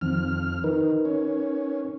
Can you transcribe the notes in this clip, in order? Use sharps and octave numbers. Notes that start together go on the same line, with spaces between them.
F2 D#3 F3 C4 F6
D#3 D#4 A#4 B4
C#4